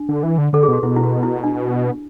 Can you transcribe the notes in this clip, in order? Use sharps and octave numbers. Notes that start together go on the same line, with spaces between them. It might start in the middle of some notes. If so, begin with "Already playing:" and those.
Already playing: D4
D3
E3
D3
D3 A4
G#4
B2 F#4
B2 E4
E4
F#4
E4
D4